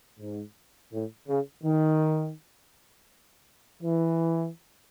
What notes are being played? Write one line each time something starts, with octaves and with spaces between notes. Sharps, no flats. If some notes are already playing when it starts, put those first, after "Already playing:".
G#2
A2
C#3
D#3
E3